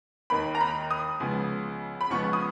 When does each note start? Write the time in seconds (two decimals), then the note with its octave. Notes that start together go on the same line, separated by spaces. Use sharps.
0.30 D#2 D#3 A#3 B5
0.55 A#5
0.60 B5
0.91 D#6
1.20 C#2 C#3 F3 B3
2.01 B5
2.10 C#2 C#3 F3 B3 C#6
2.33 D#6